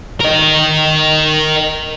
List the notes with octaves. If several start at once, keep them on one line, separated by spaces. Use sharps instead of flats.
A#4 D#5